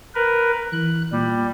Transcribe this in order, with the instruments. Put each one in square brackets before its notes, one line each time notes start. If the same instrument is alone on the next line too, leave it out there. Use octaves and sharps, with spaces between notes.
[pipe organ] A#4 B4
[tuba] E3 [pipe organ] F#6
[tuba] A#2 [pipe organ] G3